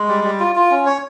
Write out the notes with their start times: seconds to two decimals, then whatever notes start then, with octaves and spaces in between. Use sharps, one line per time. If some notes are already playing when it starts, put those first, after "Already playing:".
Already playing: G#3
0.08 G3
0.24 G3
0.40 F4
0.55 F4
0.71 C#4
0.86 C#5